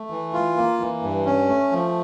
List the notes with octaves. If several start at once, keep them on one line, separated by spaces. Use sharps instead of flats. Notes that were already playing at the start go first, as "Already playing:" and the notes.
Already playing: A3
E3
F4
A#3
E3
G2
C#4
A3
F3